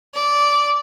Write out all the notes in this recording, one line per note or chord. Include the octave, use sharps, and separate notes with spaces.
D5